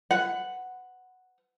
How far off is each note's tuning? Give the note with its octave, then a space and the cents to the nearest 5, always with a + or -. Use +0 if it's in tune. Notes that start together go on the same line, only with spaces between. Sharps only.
B4 +35 F#5 +0